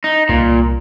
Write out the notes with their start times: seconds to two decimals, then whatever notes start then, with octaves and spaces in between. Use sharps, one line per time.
0.04 D#4
0.29 C2 A#2